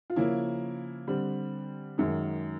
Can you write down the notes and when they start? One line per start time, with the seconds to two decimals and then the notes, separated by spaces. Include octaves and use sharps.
0.10 F4
0.16 C#3 F3 A#3 C#4 E4
1.07 D3 G3 C4
1.98 F#2 D#3 G#3